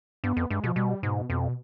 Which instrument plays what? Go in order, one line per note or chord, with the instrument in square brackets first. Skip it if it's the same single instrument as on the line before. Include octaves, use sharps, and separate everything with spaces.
[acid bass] G2 [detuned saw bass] B3
[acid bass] F2
[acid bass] G2 [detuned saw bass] G#3
[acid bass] B2 [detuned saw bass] F3
[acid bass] B2 [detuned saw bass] G3
[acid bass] G#2 [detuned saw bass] B2
[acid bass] F2 [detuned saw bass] B2